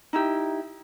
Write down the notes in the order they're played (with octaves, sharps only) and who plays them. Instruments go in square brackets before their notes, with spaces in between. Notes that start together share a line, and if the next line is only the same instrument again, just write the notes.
[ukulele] D#4 E4 G4